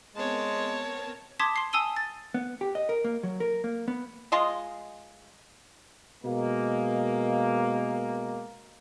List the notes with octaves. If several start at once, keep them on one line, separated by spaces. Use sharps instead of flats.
G#3 B3 C4 A#4 C#5 A5
A5 C6 D6 D#6 G#6 B6
C6 C7
G#5 A5 D#6 E6 D#7 G7
A6
B3
G4
D#5
A#4
A#3
F#3
A#4
A#3
B3
G#3 F4 G#4 D#5
B2 G#3 A#3